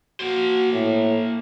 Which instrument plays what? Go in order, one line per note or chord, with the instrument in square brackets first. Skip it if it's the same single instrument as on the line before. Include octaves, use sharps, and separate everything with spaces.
[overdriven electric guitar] A#3 C5 [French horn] F#4
[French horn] A2